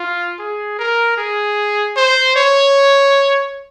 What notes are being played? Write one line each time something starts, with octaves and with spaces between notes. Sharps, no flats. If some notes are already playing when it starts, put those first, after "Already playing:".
Already playing: F4
G#4
A#4
G#4
C5
C#5